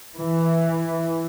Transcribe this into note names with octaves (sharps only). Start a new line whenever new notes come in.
E3